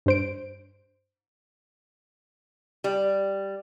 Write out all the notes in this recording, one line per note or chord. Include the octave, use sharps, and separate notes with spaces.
G2 C5 D7
G3